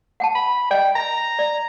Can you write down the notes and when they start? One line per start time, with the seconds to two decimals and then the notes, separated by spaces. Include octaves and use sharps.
0.20 F#5 G5 A5
0.35 B5
0.71 D5 D#5 G5
0.95 A#5
1.39 D5